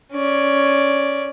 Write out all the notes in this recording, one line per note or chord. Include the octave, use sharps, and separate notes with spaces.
C#4 D5